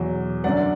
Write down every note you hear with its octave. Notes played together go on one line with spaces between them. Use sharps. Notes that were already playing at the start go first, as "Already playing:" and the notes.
Already playing: E2 B2 F#3
F#2 D3 F#3 D5 F#5